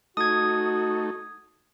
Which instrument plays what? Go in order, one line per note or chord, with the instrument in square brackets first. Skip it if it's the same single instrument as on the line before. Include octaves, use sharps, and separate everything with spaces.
[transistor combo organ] A3 D#4 [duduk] F#4 [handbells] D#6 G#6